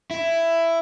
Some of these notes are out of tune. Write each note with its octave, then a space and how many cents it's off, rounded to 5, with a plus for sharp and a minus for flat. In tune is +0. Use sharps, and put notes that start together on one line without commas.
E4 +10